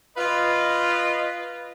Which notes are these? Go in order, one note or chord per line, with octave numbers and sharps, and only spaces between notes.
F4 B4 D#5